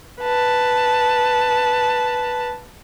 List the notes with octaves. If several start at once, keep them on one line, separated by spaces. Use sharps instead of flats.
B4 A5